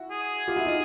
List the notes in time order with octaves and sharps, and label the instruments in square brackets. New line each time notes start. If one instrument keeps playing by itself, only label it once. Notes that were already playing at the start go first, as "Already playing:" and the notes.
Already playing: [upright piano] E4 F#4
[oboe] G#4
[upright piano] F4 G4
E4 F#4
D#4 F4